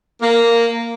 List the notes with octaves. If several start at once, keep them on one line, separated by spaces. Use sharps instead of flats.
A#3